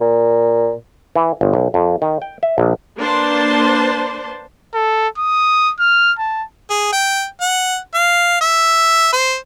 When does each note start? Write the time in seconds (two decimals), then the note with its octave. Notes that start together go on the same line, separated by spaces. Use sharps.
0.01 A#2
1.16 E3
1.41 G1
1.54 B1
1.74 F2
2.02 D#3
2.22 G5
2.43 E5
2.58 A#1
2.98 A#3 D4 B4 C5 A5 C6
4.74 A4
5.18 D#6
5.79 F6
6.18 A5
6.70 G#4
6.93 G5
7.41 F#5
7.94 F5
8.41 E5
9.13 C5